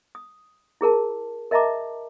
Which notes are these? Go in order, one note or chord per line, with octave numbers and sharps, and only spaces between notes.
D#6
E4 G#4 A#4 A5
A#4 D#5 E5 A5 A#5 D6